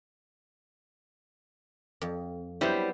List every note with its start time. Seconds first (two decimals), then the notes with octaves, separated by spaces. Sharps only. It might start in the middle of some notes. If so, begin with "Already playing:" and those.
2.01 F2
2.61 F#3 G3 B3 E4 C5